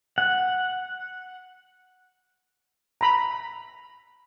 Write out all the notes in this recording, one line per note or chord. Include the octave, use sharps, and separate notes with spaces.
F#5
A#5 B5